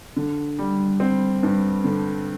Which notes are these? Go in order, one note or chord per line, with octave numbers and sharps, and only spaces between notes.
D3
G3
C4
G2
D3